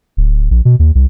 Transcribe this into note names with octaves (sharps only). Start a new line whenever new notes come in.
D1
A#1
B2
D#2
C2